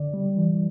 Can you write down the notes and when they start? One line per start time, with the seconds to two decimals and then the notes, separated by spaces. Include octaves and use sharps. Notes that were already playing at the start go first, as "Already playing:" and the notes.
Already playing: D3 D5
0.14 G3
0.37 E3